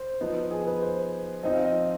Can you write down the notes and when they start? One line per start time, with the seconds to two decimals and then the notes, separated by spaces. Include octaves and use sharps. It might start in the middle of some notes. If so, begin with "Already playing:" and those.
Already playing: C5
0.21 F3 B3 D#4
0.51 G#4
0.67 B4
0.82 C5
1.43 F3 C4 D#4 D#5
1.54 F5
1.64 D#5